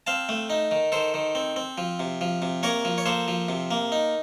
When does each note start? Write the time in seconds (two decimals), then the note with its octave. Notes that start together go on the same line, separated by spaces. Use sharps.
0.07 C4 F5 A5
0.29 A3
0.50 D#4
0.71 D#3
0.92 D#3 A4 C5
1.14 D#3
1.35 C4
1.56 C4
1.78 F3
2.00 C3
2.21 F3
2.42 C3
2.63 A#3 A#4 C#5
2.85 F3
2.98 C#5
3.06 A#3 A4 C5
3.28 F3
3.49 C3
3.71 A#3
3.92 D#4